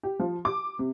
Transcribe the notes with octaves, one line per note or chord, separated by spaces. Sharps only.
G4
F3
D6
C3